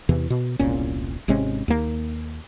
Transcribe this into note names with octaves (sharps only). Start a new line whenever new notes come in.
E2 C3 E3
B2
E1 C2 A#2 C#4
G#1 C3 G#3 C#4
D#2 A#3